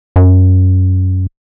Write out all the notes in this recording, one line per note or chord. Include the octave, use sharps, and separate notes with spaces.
F#2